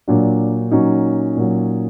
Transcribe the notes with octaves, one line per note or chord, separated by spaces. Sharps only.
A#2 F#3 D4
A#2 F#3 C#4 D#4
A#2 F#3